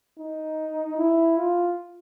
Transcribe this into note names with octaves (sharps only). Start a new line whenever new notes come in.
D#4
E4
F4